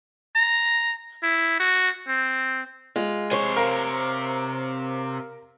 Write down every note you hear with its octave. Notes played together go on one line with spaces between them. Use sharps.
A#5
E4
F#4
C4
G#3 F4
C3 C5 C#5 G#5
A#4 F5 A#5